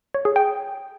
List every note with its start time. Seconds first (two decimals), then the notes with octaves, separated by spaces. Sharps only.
0.14 C#5
0.25 G#4
0.36 G5